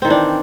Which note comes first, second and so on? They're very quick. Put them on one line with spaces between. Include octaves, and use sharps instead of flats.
C4 D#3 E3 D4